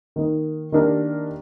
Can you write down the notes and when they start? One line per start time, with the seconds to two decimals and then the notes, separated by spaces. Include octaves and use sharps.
0.16 D#3 A#3 D#4
0.72 D#3 A#3 D4 G4 A#4